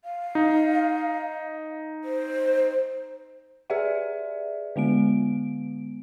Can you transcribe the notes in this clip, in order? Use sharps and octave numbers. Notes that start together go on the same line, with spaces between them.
F5
D#4
C5
G4 G#4 B4 D5 E5 F#5
D3 G#3 B3 D7